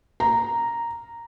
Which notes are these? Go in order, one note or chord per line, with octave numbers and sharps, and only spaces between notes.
A#5